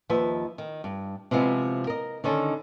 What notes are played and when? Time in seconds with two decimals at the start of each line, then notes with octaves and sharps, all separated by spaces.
0.09 D#2 F3 B4 D#5 E5
0.58 D#3
0.84 G2
1.31 C3 F3 G#3 B3 E4
1.87 A#4 D#5
2.24 D3 D#3 C#4 D#4 A4